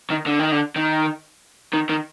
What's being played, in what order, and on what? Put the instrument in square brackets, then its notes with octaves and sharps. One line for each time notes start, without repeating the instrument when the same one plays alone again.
[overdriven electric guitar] D#3
D3
D#3
D3
D#3
D#3
D#3